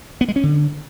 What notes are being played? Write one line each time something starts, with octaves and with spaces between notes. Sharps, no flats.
B3
G#3
C#4
D3